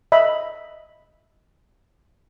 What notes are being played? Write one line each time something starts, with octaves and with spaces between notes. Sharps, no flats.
D#5 E5 B5